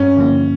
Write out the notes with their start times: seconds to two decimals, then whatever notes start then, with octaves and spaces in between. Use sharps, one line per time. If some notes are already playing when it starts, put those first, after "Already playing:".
Already playing: G2 C#4
0.17 D3 F3 A#3